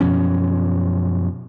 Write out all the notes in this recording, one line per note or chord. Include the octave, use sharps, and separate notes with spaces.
F#2 B2 F3 C#4